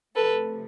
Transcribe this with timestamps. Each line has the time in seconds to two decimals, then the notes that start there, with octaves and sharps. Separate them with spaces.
0.15 C3 F3 A3 A4 B4